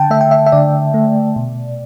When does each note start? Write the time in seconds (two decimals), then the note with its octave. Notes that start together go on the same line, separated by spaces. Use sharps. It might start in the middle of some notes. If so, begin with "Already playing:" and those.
Already playing: D3 G5 A5
0.10 A3 E5
0.21 G5
0.31 E5
0.46 E5
0.52 D3 D5
0.94 A3
1.36 B2